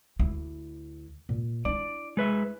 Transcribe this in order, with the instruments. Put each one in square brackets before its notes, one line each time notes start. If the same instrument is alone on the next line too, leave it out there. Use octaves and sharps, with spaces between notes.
[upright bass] D2 E4
A#2
[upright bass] D4 E4 [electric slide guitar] D5
[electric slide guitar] G#3 B4 E5